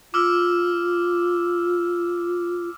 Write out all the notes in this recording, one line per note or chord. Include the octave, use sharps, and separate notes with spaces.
F4 D6 E6 F6